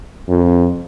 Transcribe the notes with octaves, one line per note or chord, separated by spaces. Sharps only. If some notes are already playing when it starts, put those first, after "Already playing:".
F2